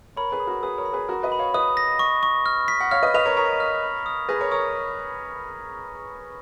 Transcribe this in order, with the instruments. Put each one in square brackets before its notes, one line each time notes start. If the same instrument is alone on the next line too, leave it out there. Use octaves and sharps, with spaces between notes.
[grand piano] A#4 C#5 [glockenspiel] B5
[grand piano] G#4 B4
[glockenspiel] D#6
[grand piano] F#4 A#4
[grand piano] G#4 B4 [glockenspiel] D#6
[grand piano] A#4 C#5
[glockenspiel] B5
[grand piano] G#4 B4
[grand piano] F#4 A#4 [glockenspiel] B5
[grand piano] B4 D#5
[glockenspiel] B5
[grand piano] C#5 F5
[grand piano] B4 D#5 [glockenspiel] D#6
[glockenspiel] A#6
C#6
C#6
F6
B6
[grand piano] F#5
[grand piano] C#5 F5 [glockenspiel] F6
[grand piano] B4 D#5
[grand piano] B4 D#5 [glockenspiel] F7
[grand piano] A#4 C#5
[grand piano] A#4 C#5 [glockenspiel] B6
[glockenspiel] F6
B5
D#6
[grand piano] G#4 B4 [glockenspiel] A#6
[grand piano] A#4 C#5
[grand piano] A#4 C#5 [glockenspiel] D#6